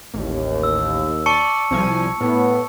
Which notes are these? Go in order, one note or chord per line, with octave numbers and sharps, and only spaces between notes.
A1 D#2
E6
D5 A5 C#6 C#7
C2 F3 G#5
A2 A3 B3